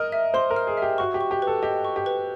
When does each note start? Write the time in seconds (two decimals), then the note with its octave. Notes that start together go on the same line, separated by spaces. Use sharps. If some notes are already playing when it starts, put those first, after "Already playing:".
Already playing: A#4 D#5 F6
0.12 E5
0.34 C5 C6
0.50 A#4
0.56 F6
0.67 G#4
0.77 G4 E5
0.98 F#4 C#6
1.14 G4
1.21 C#6
1.31 G4
1.42 A4 B4
1.63 G4 D#5
1.85 C#6
1.96 G4
2.06 B4